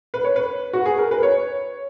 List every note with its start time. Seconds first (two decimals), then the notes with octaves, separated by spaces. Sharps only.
0.14 B4
0.24 C#5
0.36 B4
0.73 F#4
0.86 G#4
0.98 A#4
1.11 B4
1.23 C#5